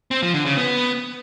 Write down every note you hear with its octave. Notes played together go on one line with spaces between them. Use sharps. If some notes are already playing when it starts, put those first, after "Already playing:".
C4
F3
D3
C#3
B3